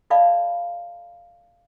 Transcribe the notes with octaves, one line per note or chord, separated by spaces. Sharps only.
A4 D5 D#5 F5 A5 B5